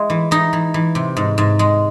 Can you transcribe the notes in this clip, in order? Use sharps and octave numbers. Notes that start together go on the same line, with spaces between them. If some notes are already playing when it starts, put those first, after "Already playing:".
Already playing: G#3 E4
E3
E3 D#4
E3
E3
C3
G#2
G#2
G#3